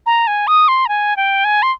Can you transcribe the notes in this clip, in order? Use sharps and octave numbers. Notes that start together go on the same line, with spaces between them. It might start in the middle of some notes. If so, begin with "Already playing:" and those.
A#5
G#5
D#6
C6
A#5
G#5
G5
G#5
C6